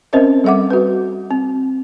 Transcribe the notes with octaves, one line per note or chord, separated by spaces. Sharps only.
C4 C#4 A#4 C5 D#5 E5
G3 A4 E5 F#5 D6
F#4 B4
C4